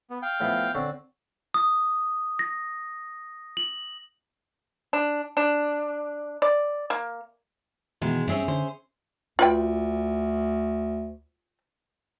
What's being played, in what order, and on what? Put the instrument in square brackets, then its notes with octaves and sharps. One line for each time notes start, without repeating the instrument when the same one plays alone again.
[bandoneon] B3
F5 G5
[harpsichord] A2 F3 B3
D3 C4 C#5
[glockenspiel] D#6
A#6
F#7
[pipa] D4
D4
D5
A#3
[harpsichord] B2 D#3 [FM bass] E3 [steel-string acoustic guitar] G#3
[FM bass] G2 [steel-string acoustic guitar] C4 C5 [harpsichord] C#4 G#4 E5
[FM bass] D3 [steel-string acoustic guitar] C5
[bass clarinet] D2 [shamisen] F4 B4 G5